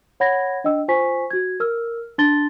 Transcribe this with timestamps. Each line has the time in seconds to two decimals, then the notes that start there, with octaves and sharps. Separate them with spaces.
0.20 C#5 F#5 B5 G#6 A#6
0.64 D4 D#5 G5 E6
0.88 F4 C5 G#5 C#6 B6
1.31 F#4 G#6
1.60 A#4 E6 F6
2.18 D4 A5 C6 A6 G7